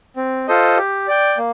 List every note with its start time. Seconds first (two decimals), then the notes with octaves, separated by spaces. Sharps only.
0.17 C4
0.48 F4 A4 C5 D#5
0.77 G4
1.08 D5 G5
1.38 A#3